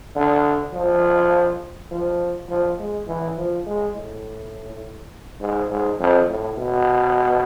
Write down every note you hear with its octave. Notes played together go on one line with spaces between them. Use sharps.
D3
F3
F3
F3
G#3
E3
F3
G#3
A2
G#2
G#2
F2
A2
B2